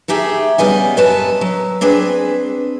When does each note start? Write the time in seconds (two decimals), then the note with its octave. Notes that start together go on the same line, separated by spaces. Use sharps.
0.08 A3 D#4 G4 G#4 E5
0.58 C#3 G3 B3 D#5 G#5
0.97 F#2 B4 C#5 A5
1.41 F#3
1.81 C4 D4 G#4 B4